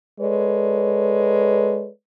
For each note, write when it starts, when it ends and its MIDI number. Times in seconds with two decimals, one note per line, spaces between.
0.21 1.88 56
0.21 1.88 69
0.21 1.88 71
0.21 1.88 73
0.21 1.88 74